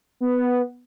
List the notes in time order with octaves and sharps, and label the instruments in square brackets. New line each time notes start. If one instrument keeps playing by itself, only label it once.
[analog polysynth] B3